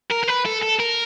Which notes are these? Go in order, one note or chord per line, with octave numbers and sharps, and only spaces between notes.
A#4
A#4
B4
A4
A4
A#4